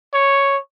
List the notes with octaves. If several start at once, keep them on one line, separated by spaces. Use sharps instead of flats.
C#5